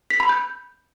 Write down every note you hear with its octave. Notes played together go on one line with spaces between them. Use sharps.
B6
B5
G6